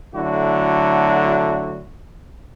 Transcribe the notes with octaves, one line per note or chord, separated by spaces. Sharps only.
D3 F#3 A3 E4 F#4